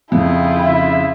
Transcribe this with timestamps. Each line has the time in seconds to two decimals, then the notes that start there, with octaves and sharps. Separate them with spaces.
0.12 F2 C#3 E4 F4 G#4 G5
0.62 C#3 E5